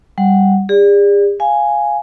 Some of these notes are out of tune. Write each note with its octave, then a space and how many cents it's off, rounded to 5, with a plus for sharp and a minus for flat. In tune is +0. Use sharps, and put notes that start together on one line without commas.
G3 +0 F#5 -5
G#4 -45 D5 +0
F5 +0 G#5 +0